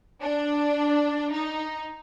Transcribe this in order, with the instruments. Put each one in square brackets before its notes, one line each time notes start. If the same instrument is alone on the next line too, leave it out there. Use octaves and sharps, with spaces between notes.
[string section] D4
D#4